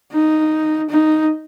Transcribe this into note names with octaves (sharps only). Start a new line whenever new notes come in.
D#4
D#4